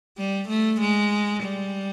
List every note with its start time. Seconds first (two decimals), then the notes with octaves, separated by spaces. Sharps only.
0.18 G3
0.49 A3
0.81 G#3
1.44 G3